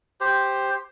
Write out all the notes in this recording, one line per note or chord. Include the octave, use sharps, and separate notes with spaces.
G4 C5